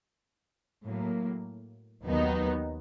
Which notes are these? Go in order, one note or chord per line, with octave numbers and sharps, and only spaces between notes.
A2 F#3 A#3
D#2 D#3 F#3 B3 D#4